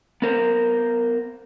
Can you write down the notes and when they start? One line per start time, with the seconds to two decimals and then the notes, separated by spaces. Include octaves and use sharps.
0.22 B3 A#4 C5